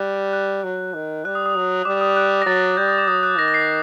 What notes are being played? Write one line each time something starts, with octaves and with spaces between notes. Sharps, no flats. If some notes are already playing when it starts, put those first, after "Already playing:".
Already playing: G3 F#6
F#6
F#3
D#3
G3 F#6
D#6
D#6
F#3
G3 D6
D#6
F#6
A#6
F#3 A6
G3 G6
D#6
D6
F#3 D#6
F#6
D#3 A#6
A#6
C7